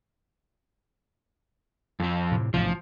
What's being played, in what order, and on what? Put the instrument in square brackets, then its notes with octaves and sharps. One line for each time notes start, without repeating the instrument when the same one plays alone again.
[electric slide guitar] F2 F3
[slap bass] A2 C3
[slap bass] A1 G#2 C3 [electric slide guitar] F3